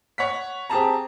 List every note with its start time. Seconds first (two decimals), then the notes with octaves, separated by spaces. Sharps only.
0.18 C#5 F#5 B6
0.70 C4 G4 G#4 A5 A#5